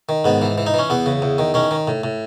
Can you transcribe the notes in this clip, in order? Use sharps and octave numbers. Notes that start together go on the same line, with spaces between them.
D#3
G#2 B3
E3
E3
D#4
E3 C#4
E2 B3
C#3
E2
D#3
D#3 C#4
D#3
A2
A2